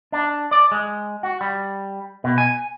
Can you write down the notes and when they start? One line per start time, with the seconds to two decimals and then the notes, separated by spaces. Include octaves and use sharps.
0.12 D4
0.51 D5
0.71 G#3
1.23 F#4
1.41 G3
2.24 B2
2.38 G#5